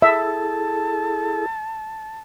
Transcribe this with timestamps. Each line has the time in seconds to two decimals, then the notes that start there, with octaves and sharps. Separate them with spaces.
0.02 E4 G#4 A4 E5 A5